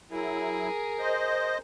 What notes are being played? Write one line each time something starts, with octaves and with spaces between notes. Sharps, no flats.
F#3 E4 G#4 A#4
C5 D#5